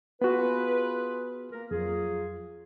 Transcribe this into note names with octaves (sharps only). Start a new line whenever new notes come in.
B3 F4 F#4 G#4 B4
A#3 A#4
F2 F#3 F4 G#4